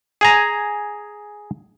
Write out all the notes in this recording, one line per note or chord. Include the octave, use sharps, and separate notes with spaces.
G#4 G#5 A#5